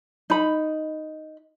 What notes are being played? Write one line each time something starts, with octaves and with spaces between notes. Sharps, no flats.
D#4 B5